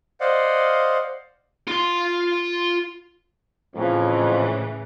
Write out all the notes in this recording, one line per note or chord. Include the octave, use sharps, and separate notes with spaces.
C5 D5 D#5 F5 F#5
F4 C6
F2 A2 C#3 E3